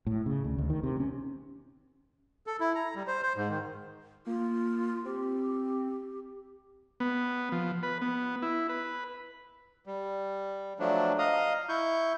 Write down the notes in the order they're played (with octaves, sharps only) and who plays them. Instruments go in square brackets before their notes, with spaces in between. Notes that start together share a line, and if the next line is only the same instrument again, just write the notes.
[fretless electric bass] A2
C#3
D2
D2
D#3
C3
C#4
[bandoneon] A4
E4
A#5
G3
C5
C5
G#2
D#3
[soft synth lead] A#3 [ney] F4
[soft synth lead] C4 [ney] G4
[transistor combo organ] B3
F3
B4
B3
E4
B4
[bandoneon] G3
F3 F#3 A3 D4
D#5 F5 A#5 D#6
E4 C#6 G6